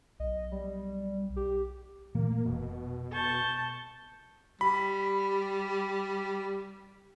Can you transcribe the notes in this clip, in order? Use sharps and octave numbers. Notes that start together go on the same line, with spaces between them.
B1 D#5
G3
G4
A#2 E3 A3 A#3
F1 B2
A5 C#6 G6
G3 B5